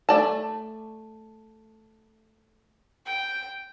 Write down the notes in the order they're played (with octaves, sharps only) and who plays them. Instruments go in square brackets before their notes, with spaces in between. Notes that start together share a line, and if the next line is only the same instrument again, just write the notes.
[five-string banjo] A3 D5 A5
[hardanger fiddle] G5